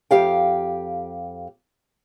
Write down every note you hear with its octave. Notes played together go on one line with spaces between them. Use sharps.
F2 G4 F5 G5